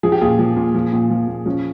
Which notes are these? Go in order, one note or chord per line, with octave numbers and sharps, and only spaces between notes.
F3 G#4
G4
A#2 F4 G#4
F3
A#2
F3
A#2
F3
A#2
F3 C#4